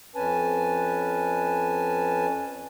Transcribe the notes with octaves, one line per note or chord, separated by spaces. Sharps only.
F2 C#4 B4 G#5 A5